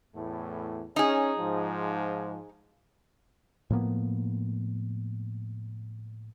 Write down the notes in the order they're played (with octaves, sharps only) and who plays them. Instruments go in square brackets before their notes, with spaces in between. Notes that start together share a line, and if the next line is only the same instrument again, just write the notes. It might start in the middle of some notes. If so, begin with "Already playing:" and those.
[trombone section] E2 A2 A3
[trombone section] C#4 [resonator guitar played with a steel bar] D#4 G#4
[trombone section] G#2 F3
[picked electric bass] A2 F3 A#3 B3